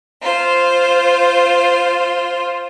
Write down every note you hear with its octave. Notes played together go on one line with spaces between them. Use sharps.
F4 C5